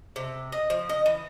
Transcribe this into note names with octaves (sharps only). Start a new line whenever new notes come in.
C3
D#5
F3
D#5
E3